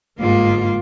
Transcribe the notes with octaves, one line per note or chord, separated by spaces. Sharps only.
G1 G#2 A#3 F4